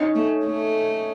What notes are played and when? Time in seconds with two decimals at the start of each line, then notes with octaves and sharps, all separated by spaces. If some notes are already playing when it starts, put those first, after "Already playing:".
Already playing: C#4 D#4
0.15 A3
0.46 A3